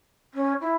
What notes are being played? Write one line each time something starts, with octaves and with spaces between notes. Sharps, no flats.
C#4
E4